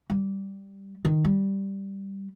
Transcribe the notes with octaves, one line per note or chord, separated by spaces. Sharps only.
G3
D#3
G3